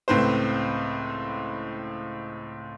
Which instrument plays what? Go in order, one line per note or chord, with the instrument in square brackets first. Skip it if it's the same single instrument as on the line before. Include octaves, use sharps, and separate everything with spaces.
[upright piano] C#2 A2 C4 B4 C5